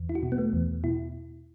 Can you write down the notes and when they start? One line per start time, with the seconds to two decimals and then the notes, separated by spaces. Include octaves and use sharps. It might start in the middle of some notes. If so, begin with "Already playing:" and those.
Already playing: E2
0.09 E4
0.15 F#4
0.23 B2
0.32 B3
0.38 A3
0.53 E2
0.84 B2 E4